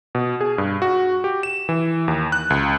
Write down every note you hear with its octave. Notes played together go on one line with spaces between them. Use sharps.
B2
G#4
G2
F#4
G4
E7
E3
D#2
F#6
C#2